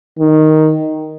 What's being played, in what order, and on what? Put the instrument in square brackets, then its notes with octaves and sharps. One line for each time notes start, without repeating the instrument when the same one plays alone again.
[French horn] D#3